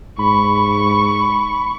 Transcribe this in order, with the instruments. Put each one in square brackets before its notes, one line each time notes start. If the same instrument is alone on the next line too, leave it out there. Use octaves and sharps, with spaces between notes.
[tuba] G#2 [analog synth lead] B5 [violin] C#6